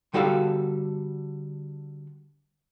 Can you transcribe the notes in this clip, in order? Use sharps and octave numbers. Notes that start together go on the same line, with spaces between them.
D3 G3 F#4 A4 C#5 F5